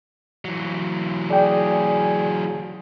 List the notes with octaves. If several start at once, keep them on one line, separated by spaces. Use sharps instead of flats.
E3 F#3
G#4 D5 G5